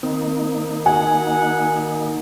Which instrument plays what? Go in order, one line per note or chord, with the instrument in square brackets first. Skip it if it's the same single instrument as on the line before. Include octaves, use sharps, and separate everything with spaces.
[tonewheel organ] D#3 A#3 D#4 [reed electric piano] C4
[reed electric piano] F#4 [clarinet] F#5 [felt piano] G#5